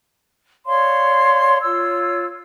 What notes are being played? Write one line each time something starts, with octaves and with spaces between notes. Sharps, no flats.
C#5 D5 F5 C6
F4 C#5 E6